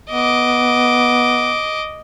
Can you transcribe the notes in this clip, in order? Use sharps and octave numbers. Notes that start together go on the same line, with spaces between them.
B3 D#5 D6